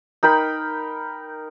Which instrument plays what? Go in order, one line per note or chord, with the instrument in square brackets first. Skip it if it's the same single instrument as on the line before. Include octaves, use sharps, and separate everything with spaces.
[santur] D#4 A#4 G5 B5